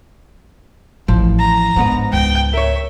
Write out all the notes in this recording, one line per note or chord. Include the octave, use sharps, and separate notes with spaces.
A1 F3
A#5
G#2 B3 D4 B4
C#2 G5
A#4 C#5 E5